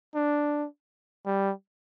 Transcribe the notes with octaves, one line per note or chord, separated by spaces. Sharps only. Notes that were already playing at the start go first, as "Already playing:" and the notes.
D4
G3